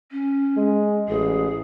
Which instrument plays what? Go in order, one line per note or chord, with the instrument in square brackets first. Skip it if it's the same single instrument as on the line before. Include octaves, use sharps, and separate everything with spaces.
[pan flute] C#4
[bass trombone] G#3
[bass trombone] A1 [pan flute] G#4